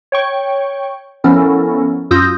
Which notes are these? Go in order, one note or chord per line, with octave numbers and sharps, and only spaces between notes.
C#5 G5 C#6
F3 B3 C#4 E4 A4 A#4
F#2 F4 D#6 E6 G6 A#6